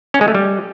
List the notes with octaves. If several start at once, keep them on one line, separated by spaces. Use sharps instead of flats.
C#4
G#3
A3
G3